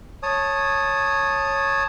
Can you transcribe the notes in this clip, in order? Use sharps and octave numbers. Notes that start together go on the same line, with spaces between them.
C#5 A5 D#6